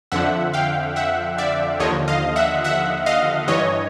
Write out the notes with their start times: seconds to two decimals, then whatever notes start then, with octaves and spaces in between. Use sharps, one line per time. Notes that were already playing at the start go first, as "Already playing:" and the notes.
0.12 F2 D3 F3 E5 F#5
0.53 F5 G5
0.96 E5 F#5
1.38 D5 E5
1.80 D#2 D3 F3 C#5 D#5
2.08 D#5 F5
2.36 E5 F#5
2.64 E5 F#5
3.06 D#5 F5
3.48 G2 E3 C#5 D#5